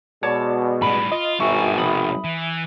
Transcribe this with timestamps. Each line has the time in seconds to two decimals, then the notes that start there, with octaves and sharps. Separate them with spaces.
0.23 B2 G#3 C#5 D5 A5 D6
0.82 A2 G3 B5
1.12 F4 D#5
1.40 G#1 G2 B2 E5 G#5 C#6
1.78 F2 C3 B5 D#6
2.24 E3